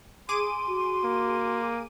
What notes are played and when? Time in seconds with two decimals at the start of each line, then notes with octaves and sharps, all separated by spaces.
0.29 G#4 C6 D6 D#7
0.68 F#4
1.05 A#3